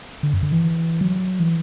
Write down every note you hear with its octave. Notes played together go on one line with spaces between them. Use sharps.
D3
F#2
D3
E3
F#3
E3